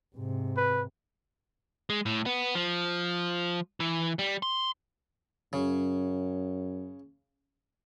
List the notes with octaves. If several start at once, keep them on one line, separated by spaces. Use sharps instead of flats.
G#2 C3
B4
G#3
A2
B3
F3
E3
G3
C6
F#2 C#3